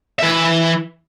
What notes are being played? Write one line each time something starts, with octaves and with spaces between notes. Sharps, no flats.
E3 E5